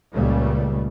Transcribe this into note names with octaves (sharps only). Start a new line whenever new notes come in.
C#2 A#2 C#3 G3 A3